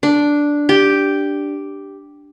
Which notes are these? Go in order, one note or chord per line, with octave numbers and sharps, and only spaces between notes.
D4
G4